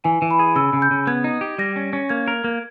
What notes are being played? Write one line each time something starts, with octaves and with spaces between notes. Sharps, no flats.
E3 G#5
E3
B5
G#4
C#3 E6
C#3
G6
C#3
B3 G#6
D#4
G4
G3 A#6
C#4
C#4
A#3 G#6
A#4
A#3